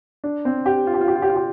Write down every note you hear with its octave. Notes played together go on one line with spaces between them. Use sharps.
D4
C4
G4
F4
G4
F4
G4
F4
G4
F4
G4